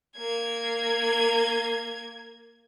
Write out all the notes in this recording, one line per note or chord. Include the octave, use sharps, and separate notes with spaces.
A#3 G#6